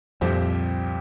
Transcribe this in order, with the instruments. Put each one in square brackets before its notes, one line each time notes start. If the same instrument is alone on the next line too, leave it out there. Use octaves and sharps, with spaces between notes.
[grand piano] C2 A#2 F3 C4 G4 [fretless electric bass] F2